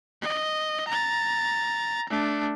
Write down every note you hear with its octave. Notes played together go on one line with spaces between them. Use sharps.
D#5
A#5 A6
A3 D4